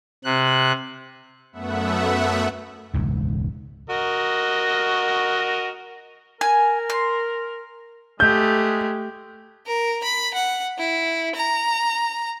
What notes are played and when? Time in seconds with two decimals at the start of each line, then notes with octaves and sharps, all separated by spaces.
0.24 C3 F#6
1.52 F#2 A3 B3 E5 F#5
2.94 E1 C#2 G#2
3.90 F#4 A#4 D#5
6.41 A#4 G#5
6.90 C6
8.20 G#3 A3 G4 G6
9.67 A#4
10.04 B5
10.34 F#5
10.78 E4
11.35 A#5